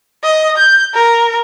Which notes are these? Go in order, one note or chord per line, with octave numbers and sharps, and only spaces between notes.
D#5
G6
A#4